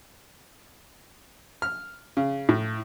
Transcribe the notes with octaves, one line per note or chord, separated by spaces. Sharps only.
F6
C#3
A2